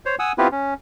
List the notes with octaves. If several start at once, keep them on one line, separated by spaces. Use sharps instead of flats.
C5 C#5
F#5 G#5 D#6 E6
B3 C4 E4 F4 G4 B4
C#4